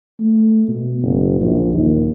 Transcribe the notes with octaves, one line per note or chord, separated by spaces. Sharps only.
A3
B2
F#1
A#1
D#2